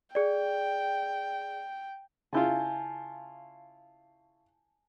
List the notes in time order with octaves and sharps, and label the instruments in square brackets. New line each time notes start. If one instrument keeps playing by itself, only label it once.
[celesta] G#4 D5 [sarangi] G5
[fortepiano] C#3 E4 F4 [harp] G#5 A5 G6